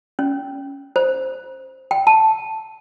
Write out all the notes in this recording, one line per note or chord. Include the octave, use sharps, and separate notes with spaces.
C#4
C5
G5
A5